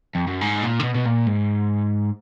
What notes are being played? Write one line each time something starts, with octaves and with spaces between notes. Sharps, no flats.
F2
F#2
G#2
A#2
D3
B2
B2
A#2
G#2